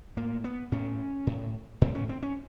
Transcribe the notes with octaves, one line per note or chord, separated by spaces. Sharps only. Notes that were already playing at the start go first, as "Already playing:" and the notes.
A2 A#3
B3
A2 C#4
A2
A2 C4
C#4
C4
C#4